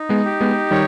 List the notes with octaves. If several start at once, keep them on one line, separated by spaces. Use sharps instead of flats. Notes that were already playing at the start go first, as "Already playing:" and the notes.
Already playing: D#4
G#3 B3
G4
G#3 B3
D#3 G3 C#5